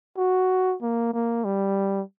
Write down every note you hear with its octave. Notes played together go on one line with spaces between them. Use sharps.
F#4
A#3
A#3
G3